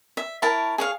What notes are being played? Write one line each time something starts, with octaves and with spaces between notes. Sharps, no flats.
E5
E4 A#4 C#5 A5
G#4 C#5 F5